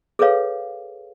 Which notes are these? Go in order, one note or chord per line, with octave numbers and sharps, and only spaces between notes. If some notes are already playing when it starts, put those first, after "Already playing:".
G#4 A4 B4 C#5 F5